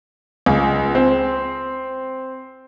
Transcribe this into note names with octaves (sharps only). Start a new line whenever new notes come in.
C#2
C4